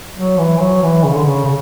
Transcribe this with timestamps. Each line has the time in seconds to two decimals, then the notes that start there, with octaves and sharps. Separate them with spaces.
0.16 F#3
0.38 E3
0.60 F#3
0.83 E3
1.04 C#3
1.14 D3
1.24 C#3
1.45 C#3